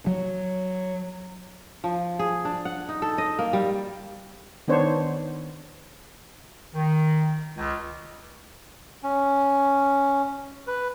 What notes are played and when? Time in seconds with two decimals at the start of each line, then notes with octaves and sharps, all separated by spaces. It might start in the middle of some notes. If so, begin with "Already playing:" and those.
0.07 F#3
1.84 F3
2.19 G#4
2.45 D4
2.65 F#5
2.89 D#4
3.02 A4
3.18 D#5
3.39 A#3
3.53 G3
4.68 D#3 B3 D4 C5 C#5
6.75 D#3
7.57 C#2
9.03 C#4
10.67 B4